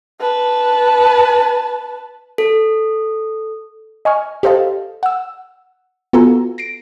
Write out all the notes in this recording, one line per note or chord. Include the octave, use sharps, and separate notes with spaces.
B4 A5
A4
D#5 G#5 C#6 F6
G4 A4 C5 D#5 F5 A5
F#5 E6
B3 F4 F#4 A4 G#5 A#5
A#6 C7 D7